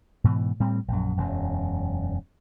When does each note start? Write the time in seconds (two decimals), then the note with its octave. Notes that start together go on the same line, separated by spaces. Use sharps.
0.24 G#2 B2 E3
0.60 A2 G3 C4
0.88 A#1 F#2
1.17 E1 F#2 F#3